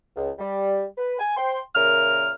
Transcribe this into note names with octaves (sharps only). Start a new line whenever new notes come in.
C#2
G3
B4
G#5
C5 G5 C6
A#2 C#3 A#4 E5 F6